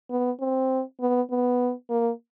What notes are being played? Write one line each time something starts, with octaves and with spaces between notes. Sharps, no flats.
B3
C4
B3
B3
A#3